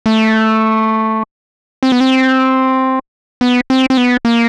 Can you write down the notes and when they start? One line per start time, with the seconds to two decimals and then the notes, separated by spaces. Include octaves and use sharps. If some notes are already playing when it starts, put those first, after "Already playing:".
0.06 A3
1.83 C4
1.92 B3
2.01 C4
3.41 B3
3.70 C4
3.90 C4
3.97 B3
4.25 A#3